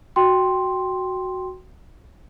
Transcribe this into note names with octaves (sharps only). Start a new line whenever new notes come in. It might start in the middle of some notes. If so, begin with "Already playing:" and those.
F#4 G5 C6